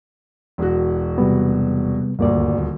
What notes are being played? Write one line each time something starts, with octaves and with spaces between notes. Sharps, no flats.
E1 F#4
C3 G3 B3
D#1 D2 G2 A#3 D5